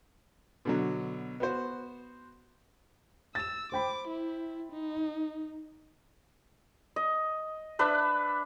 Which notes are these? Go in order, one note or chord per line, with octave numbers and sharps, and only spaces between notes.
B2 D3 F#3
B3 F#4 C5
E6 A6 E7
C5 G5 B5 D6
E4
D#4
D#5
D4 B4 E5